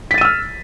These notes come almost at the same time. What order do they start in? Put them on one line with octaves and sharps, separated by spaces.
B6 A6 D#7 E6 F6